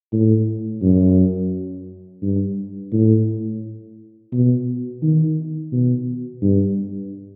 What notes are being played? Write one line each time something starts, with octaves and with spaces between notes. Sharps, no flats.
A2
F#2
G2
A2
B2
D#3
B2
G2